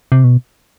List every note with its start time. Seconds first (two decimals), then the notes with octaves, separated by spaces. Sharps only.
0.12 C3
0.24 B2